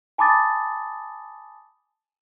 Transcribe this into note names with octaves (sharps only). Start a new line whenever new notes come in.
G#5 A5 B5 D6 D#6 A6